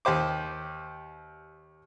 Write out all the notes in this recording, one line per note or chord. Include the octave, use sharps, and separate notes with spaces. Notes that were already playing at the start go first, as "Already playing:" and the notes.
D#2 G4 C5 D6